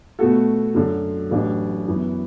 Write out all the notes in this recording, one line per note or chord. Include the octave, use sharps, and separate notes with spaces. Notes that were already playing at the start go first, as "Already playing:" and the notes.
B2 A3 F#4 A4
F#2 D3 F#3
A1 A2 F#3 D4
F#2 E3 B3